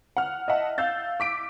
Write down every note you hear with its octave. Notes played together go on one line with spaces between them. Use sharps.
F#5 F6
D#5 E5 F#5 A5
F5 E6 G6 A6
D6 B6 D7